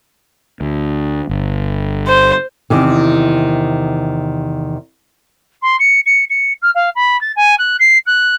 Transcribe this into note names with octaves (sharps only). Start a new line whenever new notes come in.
D2
G1
C5
E2 C3 D#3
C6
C#7
C#7
C#7
F6
F5
B5
A6
G#5
F#6
C7
F#6